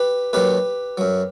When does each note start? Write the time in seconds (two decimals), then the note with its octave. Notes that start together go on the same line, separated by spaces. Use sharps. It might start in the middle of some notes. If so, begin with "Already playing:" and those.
Already playing: G4 B4
0.33 D#2 D#3 F#3 G4 B4
0.98 F#2 F#3